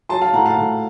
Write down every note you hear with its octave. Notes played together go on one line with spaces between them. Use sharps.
F#3 A5 C6
F5 A5
A2 F#5 A#5
F5 A5
A2